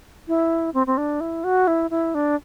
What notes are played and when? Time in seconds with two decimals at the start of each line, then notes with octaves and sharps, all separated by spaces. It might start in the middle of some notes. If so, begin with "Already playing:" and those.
0.28 E4
0.74 C4
0.87 C4
0.97 D4
1.21 E4
1.44 F#4
1.67 E4
1.91 E4
2.15 D4